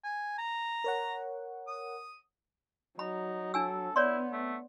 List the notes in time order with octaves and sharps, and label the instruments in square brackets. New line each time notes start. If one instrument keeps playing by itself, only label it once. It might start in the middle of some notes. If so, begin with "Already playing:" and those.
[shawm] G#5
A#5
[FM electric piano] A#4 C#5 F#5
[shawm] D#6
[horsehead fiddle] F#3 [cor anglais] D#4 [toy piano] B5
[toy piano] D4 G#5 E6 [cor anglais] A4
[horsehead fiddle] B3 [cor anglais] E4 [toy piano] C#5 D5 C6
[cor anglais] A3